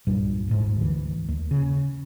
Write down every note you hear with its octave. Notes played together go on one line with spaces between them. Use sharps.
C2 G2 A#2 G3
D#1 G#1 G#2
D2 E3
D#2
C#3